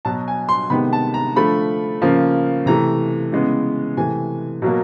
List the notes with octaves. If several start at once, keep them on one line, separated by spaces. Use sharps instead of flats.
B2 F#3 B3 A5
G#5
C6
C3 D#3 G#3 B3 B5
A5
A#5
D3 F3 A3 B5
C#3 F3 A#3
C3 E3 A3 A#5
C#3 E3 G#3 B3
C3 E3 A3 G#5
B2 F#3 A#3